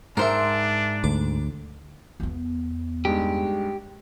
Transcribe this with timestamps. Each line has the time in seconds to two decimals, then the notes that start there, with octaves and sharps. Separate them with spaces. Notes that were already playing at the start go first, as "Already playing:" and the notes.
0.17 G#2 D4 A#4 C5 E5
1.04 D2 D6
2.20 E2 B3
3.05 G2 G#3 D#4 G4